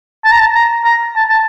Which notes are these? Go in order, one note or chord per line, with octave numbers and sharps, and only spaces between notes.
A5
A#5
A5
A#5
A#5
A5
A5